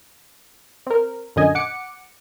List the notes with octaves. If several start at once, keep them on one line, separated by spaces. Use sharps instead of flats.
C4 A#4
F#2 A#2 D3 D#5 G#5
F#5 D6 C#7